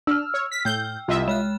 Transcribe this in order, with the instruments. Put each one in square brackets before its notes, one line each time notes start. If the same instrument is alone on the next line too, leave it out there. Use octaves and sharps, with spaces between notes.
[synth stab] D4 [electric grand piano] E6 F6
[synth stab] C#5
B6
[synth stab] A2 G6 [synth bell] G5
[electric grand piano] C2 [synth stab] F4 D#5 E5
[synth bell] G#3 F6 F#6 [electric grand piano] E7